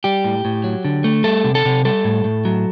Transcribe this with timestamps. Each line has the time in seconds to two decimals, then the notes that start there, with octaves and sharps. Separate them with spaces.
0.04 G3 G4
0.24 A2
0.45 A2
0.64 F#3
0.85 D3
1.04 A3
1.24 G3 A4
1.44 C3
1.55 A4
1.65 C3
1.85 G3 A4
2.04 A2
2.24 A2
2.45 F#3